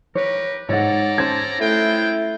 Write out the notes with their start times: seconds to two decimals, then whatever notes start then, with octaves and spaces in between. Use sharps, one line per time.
0.15 G4 A#4 B4 C#5
0.69 G#2 A4 C#5 D5 F#5 A#5
1.18 C#4 C5 A5 G#6
1.60 G#3 A3 E4 F4 G5